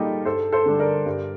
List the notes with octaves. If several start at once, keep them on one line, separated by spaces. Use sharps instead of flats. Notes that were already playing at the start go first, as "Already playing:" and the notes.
Already playing: A#2 G3 A#3 D#4 F4 G4 A4
G2 A4 C5
A4 C5
D3 G3 D4
A#4 D5
G2